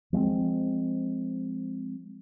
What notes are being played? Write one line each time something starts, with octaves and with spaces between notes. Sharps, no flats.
F3 G#3 B3 C4